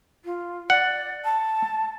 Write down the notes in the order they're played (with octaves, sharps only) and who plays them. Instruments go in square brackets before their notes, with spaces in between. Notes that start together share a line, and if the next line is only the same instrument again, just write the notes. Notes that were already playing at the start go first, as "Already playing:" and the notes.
[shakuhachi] F4
[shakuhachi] D5 [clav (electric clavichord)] F#5
[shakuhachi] A5